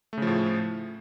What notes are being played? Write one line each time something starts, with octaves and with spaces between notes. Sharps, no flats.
A2 C#3 F3 A3